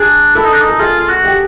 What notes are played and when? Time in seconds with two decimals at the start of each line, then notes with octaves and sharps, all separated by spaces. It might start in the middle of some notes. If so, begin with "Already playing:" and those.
Already playing: D4 G#4
0.35 E4 A4
0.44 D#4
0.52 D4
0.60 D#4
0.69 A4
0.80 F4 G#4
1.00 F4
1.09 F#4
1.24 G4